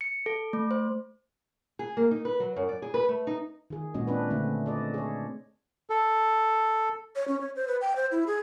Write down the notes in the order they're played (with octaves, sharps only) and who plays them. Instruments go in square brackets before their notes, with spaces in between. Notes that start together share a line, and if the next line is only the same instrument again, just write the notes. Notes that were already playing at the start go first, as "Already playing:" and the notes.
[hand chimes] C#7
A4
A3
C5
[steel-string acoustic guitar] G#4
A#3
D#4
B4
F#3
F#2
D5
G#4
B4
A3
D#4
[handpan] D#3 G#4
A#2 G#3 C#4 F#4 D#5
C4 D4 B4
D3 A3 C4
A4 D5 D#5
G#4 C#5
[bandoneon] A4
[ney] C#5
C#4
C#5
C5
B4
G5
C5
E4
G#4